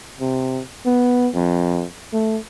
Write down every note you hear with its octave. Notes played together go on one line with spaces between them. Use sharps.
C3
B3
F2
A3